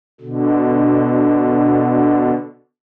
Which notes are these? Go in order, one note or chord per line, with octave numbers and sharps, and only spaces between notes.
B2 D3